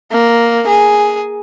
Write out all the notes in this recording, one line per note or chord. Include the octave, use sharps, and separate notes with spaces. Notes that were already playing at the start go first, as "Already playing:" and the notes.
A#3
G#4